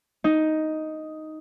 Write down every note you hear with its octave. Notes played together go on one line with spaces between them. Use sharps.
D#4